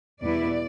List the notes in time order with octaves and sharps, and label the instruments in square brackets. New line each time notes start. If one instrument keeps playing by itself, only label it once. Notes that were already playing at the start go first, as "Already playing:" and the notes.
[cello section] E2 B2 G3 B3 E4 D5